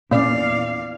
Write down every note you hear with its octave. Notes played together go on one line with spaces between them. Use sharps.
E2 A#2 A#3 C#4 D5 F5